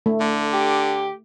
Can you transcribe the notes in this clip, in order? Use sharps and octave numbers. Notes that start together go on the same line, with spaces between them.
A3
D3
G4